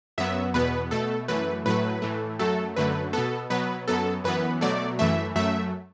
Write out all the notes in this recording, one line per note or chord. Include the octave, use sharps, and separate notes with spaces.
F#2 F#3 B3 E5
E2 B2 B3 B4
B2 A3 A4
F#2 E3 A3 B4
A2 F#3 A3 B4
A2 E3 A3
F#2 F#3 A3 A4
F#2 D3 F#3 A3 B4
B2 B3 A4
B2 F#3 B3 B4
F#2 F#3 B3 A4
F#2 E3 B3 B4
B2 F#3 A3 D5
F#2 E3 A3 E5
F#2 F#3 A3 E5